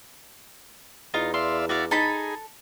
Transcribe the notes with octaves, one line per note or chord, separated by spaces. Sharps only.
E2 D#4 F4 F5
D5 E5 F5 C6
E4 F#4 D5 F5 F#5
D#4 G#4 A4 A5 B5